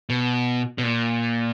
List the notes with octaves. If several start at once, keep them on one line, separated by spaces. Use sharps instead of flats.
B2
B2
A#2